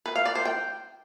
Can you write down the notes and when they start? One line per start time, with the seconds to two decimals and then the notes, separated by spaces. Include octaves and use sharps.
0.06 B4
0.16 F5
0.25 D5
0.35 C5
0.45 G5